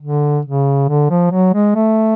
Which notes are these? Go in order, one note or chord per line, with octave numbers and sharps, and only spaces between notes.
D3
C#3
D3
F3
F#3
G#3
A3